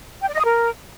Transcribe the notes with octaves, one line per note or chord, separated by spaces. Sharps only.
G5
D5
D#5
D#6
A#4